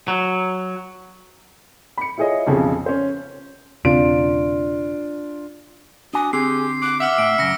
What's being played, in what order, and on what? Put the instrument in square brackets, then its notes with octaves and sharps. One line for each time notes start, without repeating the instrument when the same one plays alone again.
[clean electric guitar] F#3
[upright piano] B5 C#7
E4 F4 G#4 C#5 D#5
B1 F2 C#3 F3 G3
C#4 C5
[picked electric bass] E1 C#3 C4 [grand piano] D4 F4 D7
[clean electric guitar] D4 F#4 G#5 [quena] D#6
[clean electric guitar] D3 C4 [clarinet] G4 [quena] G#4 [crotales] C7
[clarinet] D6 [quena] F#6
[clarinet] E5 [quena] F#5 [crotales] D6 E6 F6
[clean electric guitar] A2 [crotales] D7
[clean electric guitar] F#2 C#3 [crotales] A#6 C#7